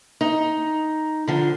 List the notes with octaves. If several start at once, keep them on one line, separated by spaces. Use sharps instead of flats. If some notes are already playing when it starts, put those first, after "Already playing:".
D#4
D3 F3